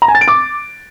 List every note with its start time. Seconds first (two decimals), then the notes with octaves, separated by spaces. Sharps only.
0.02 A#5
0.08 G#5
0.15 A6
0.21 D7
0.28 D6